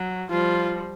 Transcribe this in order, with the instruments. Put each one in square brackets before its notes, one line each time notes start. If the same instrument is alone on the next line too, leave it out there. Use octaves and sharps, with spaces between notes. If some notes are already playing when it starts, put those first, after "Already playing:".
Already playing: [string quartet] F#3
[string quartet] F3 G3 [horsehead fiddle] F4